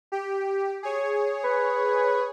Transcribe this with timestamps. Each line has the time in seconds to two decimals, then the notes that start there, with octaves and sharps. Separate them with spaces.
0.12 G4
0.83 G#4 C#5
1.44 B4